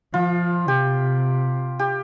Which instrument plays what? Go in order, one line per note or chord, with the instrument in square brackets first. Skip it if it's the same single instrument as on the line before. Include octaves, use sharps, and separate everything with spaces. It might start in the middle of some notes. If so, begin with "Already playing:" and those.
[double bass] F3 [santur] F4
[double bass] C3 [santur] G4
[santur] G4